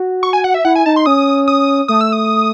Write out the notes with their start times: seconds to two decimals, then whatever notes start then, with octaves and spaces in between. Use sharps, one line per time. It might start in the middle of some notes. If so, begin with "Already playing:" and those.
Already playing: F#4
0.23 C#6
0.33 G#5
0.44 F#5
0.54 E5
0.65 E4 F#5
0.76 G#5
0.86 D#4 A5
0.96 C6
1.06 C#4 D#6
1.48 D#6
1.88 A3 D#6
2.01 E6
2.12 D#6